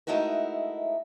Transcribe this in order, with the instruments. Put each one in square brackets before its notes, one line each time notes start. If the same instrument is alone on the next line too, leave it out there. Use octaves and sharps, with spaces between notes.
[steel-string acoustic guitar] G#3 A3 D#4 E4 F#4 A#4